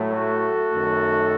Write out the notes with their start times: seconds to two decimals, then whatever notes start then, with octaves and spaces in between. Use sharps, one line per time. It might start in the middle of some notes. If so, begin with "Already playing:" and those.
Already playing: A2 F#3 A3
0.11 F#4 A4
0.72 F#2 D#3 A3